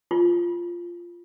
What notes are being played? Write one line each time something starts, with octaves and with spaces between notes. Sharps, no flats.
F4